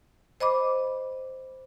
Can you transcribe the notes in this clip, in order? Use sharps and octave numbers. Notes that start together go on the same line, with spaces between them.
C5 D#5 B5 D6